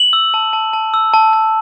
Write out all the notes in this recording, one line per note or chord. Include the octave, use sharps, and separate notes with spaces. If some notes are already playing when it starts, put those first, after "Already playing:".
Already playing: F#7
E6
A5
A5
A5
E6
A5
A5